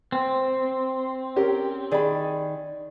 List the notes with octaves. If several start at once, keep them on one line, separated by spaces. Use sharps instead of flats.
C4
C#4 G4 A#4
D#3 G#4 D5 B5